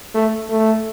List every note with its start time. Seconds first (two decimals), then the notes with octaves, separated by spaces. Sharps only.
0.14 A3
0.50 A3